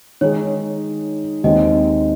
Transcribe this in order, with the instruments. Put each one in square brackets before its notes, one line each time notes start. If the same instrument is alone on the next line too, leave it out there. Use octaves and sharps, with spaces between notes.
[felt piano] D#3 G#3 D#4 G#4 [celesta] C#5
[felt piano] D#2 D#3 G#3 C4 D#4 [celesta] D#5